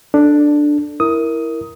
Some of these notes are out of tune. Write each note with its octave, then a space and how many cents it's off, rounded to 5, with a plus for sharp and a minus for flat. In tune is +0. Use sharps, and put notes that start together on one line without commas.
D4 +5 A4 +0
E4 -5 A#4 +0 D#6 +10